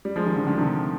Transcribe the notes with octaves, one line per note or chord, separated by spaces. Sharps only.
G3
F3 G#3
D#3 G3
D3 F3
D3 F3
C3 D#3